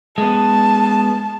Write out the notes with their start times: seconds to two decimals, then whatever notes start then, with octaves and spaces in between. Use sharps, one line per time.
0.18 G#3 B3 A5